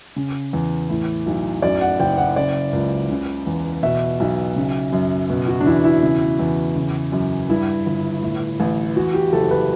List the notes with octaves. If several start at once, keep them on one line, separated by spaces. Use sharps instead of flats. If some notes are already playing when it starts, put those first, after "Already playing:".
C#3
E2
A2
B1
F#2 D5
F#5
F#1 G5
F#5
C#3 D5
C#2
C#3
E2
B2 E5
B1
C#3
F#2
B2
F#4
D4
E2 E4
E4
C#3
E2
C#3
F#2
G2 E4
G1
A2
A1
E2 F#4
G4
F#1 A4
B4